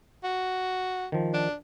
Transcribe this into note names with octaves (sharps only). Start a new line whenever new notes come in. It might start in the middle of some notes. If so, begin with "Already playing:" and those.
F#4
D#3 F3
D4